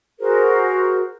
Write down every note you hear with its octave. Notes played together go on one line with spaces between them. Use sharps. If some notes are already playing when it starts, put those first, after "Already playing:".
F#4 G#4 A#4 C5